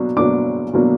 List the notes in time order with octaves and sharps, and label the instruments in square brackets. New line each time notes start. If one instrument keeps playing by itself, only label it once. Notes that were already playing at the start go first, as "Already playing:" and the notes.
Already playing: [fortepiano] B2 F#3 A#3 D4
B2 F#3 A#3 D4 D6
B2 F#3 A#3 D4